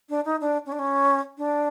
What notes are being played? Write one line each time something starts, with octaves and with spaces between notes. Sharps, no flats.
D4
D#4
D4
C#4
D4
C#4
D4